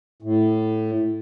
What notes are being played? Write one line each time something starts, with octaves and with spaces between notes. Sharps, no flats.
A2